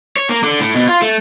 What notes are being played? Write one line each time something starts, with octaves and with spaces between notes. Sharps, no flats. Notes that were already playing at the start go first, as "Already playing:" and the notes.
C#5
A#3
D3
A2
B2
F4
A3